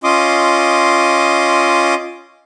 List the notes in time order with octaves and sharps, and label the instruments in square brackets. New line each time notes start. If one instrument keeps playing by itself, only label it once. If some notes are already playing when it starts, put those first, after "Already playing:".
[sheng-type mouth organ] C#4 F4 D#5 C6 D6 D#6